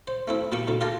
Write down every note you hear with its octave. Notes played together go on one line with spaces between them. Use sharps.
C5
A3 C4 E4
A#2 G3 A#3 G5 C#6
D2 A#2 D3
F4 G4 G#4 A#4 A5